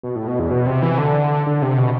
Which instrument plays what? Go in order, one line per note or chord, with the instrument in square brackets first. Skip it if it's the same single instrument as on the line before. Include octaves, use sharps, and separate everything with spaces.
[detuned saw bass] B2
A2
B2
E2
B2
C3
E3
D3
D3
C3
B2